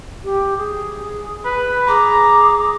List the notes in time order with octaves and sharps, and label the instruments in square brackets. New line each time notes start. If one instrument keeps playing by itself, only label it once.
[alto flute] G4
G#4
[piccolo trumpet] B4
[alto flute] G#4 [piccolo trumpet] A#5 [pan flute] D6